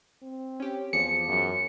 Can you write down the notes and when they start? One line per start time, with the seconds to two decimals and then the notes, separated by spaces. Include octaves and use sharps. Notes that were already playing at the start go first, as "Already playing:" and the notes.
0.22 C4
0.60 C#4 G4
0.93 E2 F3 G#4 D6 C#7
1.29 F#2